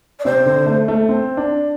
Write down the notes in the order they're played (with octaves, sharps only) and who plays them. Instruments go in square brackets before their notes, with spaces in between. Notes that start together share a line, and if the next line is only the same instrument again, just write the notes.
[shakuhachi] D5
[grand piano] C3 [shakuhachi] C5
[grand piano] D3
A3
A3
C4
D4